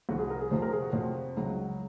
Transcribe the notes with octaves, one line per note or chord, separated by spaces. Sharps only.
C2 C3 F3 F#4
G#4
A#4
G#4
F2 C3 F3 C5
A#4
G#4
F#4
F2 C3 F3
C#2 C#3 F#3